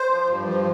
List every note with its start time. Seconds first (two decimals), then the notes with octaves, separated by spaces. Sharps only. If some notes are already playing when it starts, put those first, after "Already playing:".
Already playing: C5
0.10 F3
0.28 G2
0.47 F3